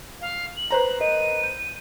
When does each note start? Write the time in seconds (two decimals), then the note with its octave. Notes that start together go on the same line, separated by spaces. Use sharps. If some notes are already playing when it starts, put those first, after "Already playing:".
0.21 F5
0.57 F#7
0.70 B4 C5 A#5
1.00 A#4 D#5 D#7
1.43 G6